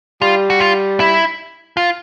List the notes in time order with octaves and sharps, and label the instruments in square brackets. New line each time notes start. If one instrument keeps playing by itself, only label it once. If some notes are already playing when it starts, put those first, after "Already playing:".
[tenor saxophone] G3 [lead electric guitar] F4
[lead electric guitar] F#4
F4
E4
F4